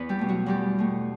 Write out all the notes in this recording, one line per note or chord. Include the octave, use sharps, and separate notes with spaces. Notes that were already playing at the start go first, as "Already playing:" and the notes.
Already playing: E2 B3 B4 D5
G3 G4
B2 A3
F#3 F#4
E2 G3 G4
B2 A3